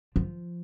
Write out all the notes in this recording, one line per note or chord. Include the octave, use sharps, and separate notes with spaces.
F3